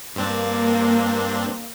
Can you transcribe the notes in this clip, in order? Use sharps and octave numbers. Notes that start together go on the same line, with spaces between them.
G2 A#3 C4 D4